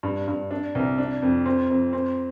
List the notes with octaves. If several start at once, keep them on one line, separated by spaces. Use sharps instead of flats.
G2
G2
D4
C2
D4
F2
C4
F2
C4